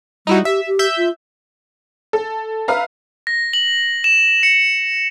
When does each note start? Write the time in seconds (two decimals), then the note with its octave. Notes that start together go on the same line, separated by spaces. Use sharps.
0.27 G3 D#4 E4 F#4
0.45 G4 E5
0.67 G4
0.79 E5 G6
0.98 F4
2.13 A4
2.68 B4 E5 F5 A#5
3.27 A#6
3.53 F#7
4.04 E7
4.43 C#7